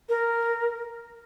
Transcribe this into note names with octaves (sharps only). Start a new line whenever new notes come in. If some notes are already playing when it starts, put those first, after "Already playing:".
A#4